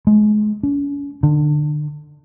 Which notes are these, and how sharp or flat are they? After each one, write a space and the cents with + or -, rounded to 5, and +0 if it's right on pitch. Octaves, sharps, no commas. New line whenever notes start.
G#3 +30
C#4 +40
D3 +30